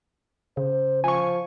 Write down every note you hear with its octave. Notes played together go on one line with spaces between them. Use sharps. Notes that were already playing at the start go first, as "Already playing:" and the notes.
C#3 C5
F3 G#5 C#6